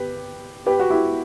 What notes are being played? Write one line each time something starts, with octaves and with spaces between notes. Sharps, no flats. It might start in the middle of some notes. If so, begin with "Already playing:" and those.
Already playing: G4 B4
G4 B4
F#4
E4 G4